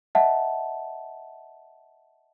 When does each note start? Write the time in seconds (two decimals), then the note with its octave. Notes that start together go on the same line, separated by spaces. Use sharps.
0.15 D#5 E5 F#5 A5